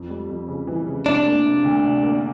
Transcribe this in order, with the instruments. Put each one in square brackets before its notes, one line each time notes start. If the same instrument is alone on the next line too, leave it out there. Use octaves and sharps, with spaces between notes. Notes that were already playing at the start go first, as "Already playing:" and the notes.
Already playing: [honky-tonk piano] F2
G3
F2
C#3
E3
C#3
[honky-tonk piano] C3 [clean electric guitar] D4
[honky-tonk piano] A#3
C3
D2
C3
A#3